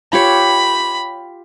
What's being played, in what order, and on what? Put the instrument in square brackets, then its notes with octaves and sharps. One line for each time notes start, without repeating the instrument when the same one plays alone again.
[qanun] F4 G4 C#5 [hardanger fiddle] B5